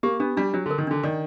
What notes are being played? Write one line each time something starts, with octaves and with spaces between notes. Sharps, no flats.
A#3 G4
B3 D4
G3 D4
F#3 D4
D3
A#4
D#3
D3 D4
D#3 D5